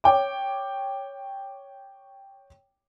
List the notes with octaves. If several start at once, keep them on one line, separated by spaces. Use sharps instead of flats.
C#5 G5 D6